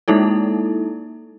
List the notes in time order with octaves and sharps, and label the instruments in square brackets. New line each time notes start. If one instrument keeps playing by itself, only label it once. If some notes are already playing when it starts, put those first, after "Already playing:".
[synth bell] G#3 A#3 D#4 E4 A4